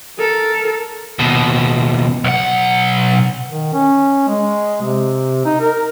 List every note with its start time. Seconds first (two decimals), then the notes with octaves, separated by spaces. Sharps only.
0.18 A4 A#4
1.19 D#2 B2
2.24 B1 F#5
3.49 D#3
3.74 C#4
4.28 G#3
4.82 C3
5.46 D#4
5.61 A#4